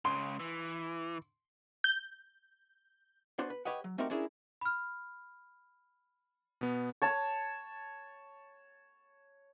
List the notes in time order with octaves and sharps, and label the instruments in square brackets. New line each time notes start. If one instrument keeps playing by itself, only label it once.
[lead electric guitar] C#2 C#3 [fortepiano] C6
[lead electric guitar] E3
[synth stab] G6
[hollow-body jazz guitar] B3 D4 F#4 C5
B4
G4 B4 C#5 D#5 F#5
F#3
A3 C4 D#4 F#4 G4 A#4
C#4 D4 E4 G#4 A#4
[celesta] B5 F6
[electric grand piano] B2 B3
[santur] C#5 A5